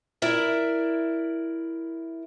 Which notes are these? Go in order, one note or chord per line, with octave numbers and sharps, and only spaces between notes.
E4 A#4 D5 E5